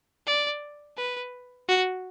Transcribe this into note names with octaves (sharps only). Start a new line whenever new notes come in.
D5
B4
F#4